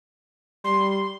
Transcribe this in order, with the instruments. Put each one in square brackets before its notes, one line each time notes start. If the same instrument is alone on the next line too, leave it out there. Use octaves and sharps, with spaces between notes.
[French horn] G3 [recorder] C6